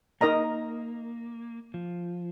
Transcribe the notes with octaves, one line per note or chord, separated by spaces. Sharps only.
A#3 D#4 A#4 D#5 A#5
F3